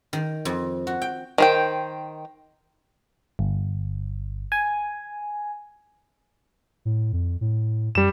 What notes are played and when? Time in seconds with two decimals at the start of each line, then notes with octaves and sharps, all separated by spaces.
0.13 D#3
0.45 F2
0.87 F#4
1.02 G5
1.38 D#3 C5 G5
3.39 G1
4.52 G#5
6.85 A2
7.13 F2
7.41 A2
7.95 F#2 G3 E7